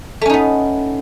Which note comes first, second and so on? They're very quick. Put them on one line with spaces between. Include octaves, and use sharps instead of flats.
A3 C#4 D#4 B3